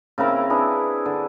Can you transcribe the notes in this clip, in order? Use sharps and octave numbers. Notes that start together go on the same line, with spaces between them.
C#3 C4 E4 A#4
D4 E4 G#4 B4
D3